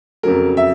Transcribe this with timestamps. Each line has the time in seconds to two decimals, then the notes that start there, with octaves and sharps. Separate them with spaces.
0.23 F2 C#3 F#3 A#4
0.57 E5